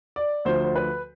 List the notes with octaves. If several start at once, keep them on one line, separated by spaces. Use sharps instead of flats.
D5
D2 D3 F3 C5
C5
B4